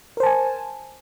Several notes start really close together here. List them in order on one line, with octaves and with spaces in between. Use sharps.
A#4 C5 A5 G#5